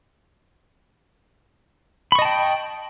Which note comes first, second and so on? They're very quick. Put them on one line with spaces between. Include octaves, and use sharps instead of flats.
B5 C#6 D#5 A5 G5